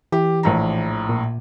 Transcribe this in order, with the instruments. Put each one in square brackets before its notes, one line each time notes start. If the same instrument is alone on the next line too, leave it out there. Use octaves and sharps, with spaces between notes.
[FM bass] E3 [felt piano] G4
[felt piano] A#1 A2 A#5
[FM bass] A#2